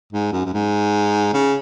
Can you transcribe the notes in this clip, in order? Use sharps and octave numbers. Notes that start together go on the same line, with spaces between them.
G#2
F#2
F#2
G#2
C#3